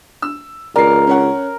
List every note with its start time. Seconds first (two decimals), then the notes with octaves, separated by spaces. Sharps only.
0.22 E6
0.76 C#2 A#4 D5 C7
1.07 C#4 C#5 F#5